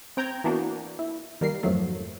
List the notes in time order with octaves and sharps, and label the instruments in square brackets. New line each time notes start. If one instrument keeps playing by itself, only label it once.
[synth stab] C4 G5 A#5 G6 G#6
E3 A#3 B3 D4 F#4
E4
D#3 G3 A#3 A#4 C7
F2 G#2 F3 F#3 A3